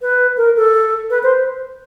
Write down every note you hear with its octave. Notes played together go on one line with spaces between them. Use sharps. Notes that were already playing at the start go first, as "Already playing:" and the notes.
B4
A#4
A4
B4
C5